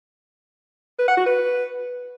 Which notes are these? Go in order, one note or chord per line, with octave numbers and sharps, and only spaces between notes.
B4
F#5
F#4
B4